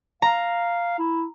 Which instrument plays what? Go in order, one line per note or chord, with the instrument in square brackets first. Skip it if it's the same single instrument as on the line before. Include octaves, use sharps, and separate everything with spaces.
[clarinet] F5 [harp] A#5
[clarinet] E4